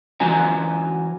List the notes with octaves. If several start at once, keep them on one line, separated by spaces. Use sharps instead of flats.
E3 F#3 C#4 G#5 A#5